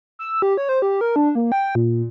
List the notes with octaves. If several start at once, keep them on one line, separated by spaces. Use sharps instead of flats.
E6
G4
C#5
C5
G4
A#4
D4
A#3
G5
A#2